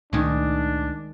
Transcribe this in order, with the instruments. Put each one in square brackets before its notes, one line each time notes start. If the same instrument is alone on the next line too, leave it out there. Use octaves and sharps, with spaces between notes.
[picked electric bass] C#2 A#2 A3 [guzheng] D#3 G#3 [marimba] C#4 [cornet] D4